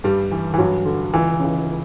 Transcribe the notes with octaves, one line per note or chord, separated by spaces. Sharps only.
G2 G3
E3
E3
G2 F#3
D3
C#2 E3
C#3 E3